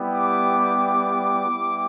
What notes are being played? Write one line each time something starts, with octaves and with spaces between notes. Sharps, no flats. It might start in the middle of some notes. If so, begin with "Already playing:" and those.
Already playing: G3 B3 E4 G4
D6
G3 B3 E4 G4